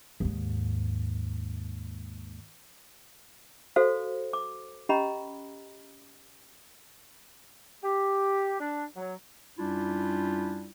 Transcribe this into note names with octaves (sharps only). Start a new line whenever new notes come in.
D#2 G#2
F#4 A4 C5 F5
D6
C#4 G4 D#5 A#5 B5
G4
D4
F#3
F#2 G3 D4 E4 F4